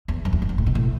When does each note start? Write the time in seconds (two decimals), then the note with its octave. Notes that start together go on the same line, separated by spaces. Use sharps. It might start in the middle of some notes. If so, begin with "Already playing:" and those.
0.08 E2
0.25 F#2
0.33 E2
0.42 F#2
0.49 E2
0.58 A2
0.66 B2
0.75 A2